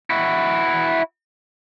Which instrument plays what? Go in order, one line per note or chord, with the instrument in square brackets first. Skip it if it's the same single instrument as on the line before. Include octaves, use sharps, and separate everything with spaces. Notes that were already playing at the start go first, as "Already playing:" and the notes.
[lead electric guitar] E4 F#4